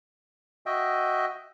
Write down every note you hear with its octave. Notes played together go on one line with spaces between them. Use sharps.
F#4 D#5 E5 G5